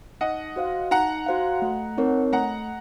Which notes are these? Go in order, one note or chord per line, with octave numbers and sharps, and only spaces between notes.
D#4 D#5 F#5
F#4 C5 F5
D#4 F#5 A#5
F#4 C5 F5
A3
C4 D#4 A#4 C#5
A3 F#5 A#5